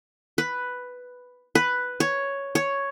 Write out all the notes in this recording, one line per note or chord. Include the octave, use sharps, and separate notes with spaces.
B4
B4
C#5
C#5